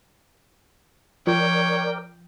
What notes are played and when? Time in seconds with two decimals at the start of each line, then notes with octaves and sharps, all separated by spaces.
1.27 F3 A#4 C#5 D5 G5